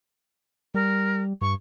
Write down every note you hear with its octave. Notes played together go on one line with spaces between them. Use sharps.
G3 A#4
G2 C#6